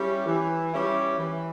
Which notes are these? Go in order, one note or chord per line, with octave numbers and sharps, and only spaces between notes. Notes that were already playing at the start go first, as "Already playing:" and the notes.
Already playing: G3 C#4 E4 G4
E3
G3 C#4 E4 G4
E3